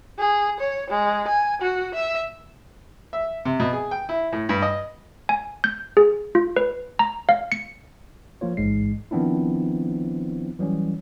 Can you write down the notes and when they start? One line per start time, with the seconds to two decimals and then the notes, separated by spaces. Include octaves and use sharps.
0.19 G#4
0.60 C#5
0.90 G#3
1.28 G#5
1.62 F#4
1.94 E5
3.13 E5
3.45 C3
3.60 B2
3.73 G#4
3.91 G5
4.09 E4
4.32 A2
4.49 G2
4.62 D#5
5.29 G#5
5.64 G6
5.97 G#4
6.35 F4
6.56 B4
6.99 A#5
7.29 F5
7.52 C#7
8.41 F3 A#3 F4 C#5
8.57 A1 G#2 G#3 C7
9.11 D#3 F3 B3 C4 D4 E4
10.59 E3 F#3 G3 C#4